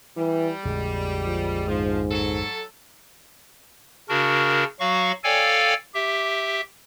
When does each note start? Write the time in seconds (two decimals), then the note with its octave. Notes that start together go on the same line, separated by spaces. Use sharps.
0.17 E3 G3
0.65 A#1 F2 D3 G#3
1.23 F3
1.68 G#2 F3
2.11 F#3 A4
4.09 C#3 D4 F#4 A#4
4.80 F#3 F#4 F5 C#6
5.24 A4 C#5 D5 F5 G5 G#5
5.95 G4 E5